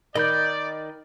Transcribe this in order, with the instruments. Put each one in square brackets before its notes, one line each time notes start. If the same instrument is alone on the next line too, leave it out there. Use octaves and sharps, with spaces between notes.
[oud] D#3 [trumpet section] D5 [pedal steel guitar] D#5 B5 G6